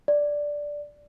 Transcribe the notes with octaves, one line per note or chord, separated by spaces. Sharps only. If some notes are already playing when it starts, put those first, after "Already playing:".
D5